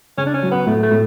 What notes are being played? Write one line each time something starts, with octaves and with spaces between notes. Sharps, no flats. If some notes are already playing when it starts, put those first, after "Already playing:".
C#3 C#4
D4
C#4
F#3
B3
A2 A3
A3
A2